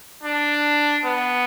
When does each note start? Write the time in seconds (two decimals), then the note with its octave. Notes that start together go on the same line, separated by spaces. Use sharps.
0.24 D4
1.06 B3